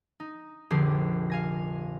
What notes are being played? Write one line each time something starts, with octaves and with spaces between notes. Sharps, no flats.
D#4
F1 A#1 D3 G4 G#4 C7
F5 G#5 A#6